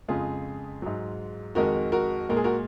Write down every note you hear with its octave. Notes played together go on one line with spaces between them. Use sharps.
F2 C#3 G#3 F4 G#4
G#2 F#3
F2 D#3 G#3 F#4 A#4
F#4 A#4
A#2 G#3 A#4
G#4
F#4 A#4